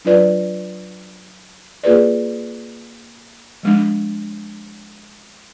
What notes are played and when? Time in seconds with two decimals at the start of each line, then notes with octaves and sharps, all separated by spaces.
0.05 F#3 D4 F4 B4 D5
1.83 A#3 F4 G#4 B4 D5
3.63 F3 G#3 D4